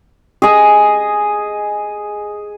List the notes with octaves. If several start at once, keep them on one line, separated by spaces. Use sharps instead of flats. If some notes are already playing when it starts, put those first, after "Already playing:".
G#4 D#5